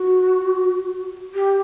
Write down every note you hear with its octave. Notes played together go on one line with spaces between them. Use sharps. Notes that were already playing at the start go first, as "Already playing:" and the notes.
Already playing: F#4
G4